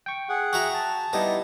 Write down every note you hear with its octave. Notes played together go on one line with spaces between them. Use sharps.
G5 C#6
G#4 F#5
F#4 E5 A#5
A5
G3 B3 D#4 E4 D#5